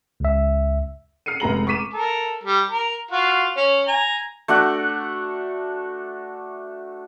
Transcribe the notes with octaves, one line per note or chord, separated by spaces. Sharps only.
C#2 E5
F6 C7 C#7 D#7
F1 G#3 A#5 F#7
C#6 D6 B6 D#7 E7
A4 A#4
G3
A#4
F4 F#4 F5
C#4
G#5 A#5
A3 D4 F#4 F#5